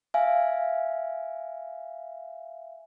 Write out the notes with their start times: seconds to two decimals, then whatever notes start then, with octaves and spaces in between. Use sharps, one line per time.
0.14 E5 F5 G#5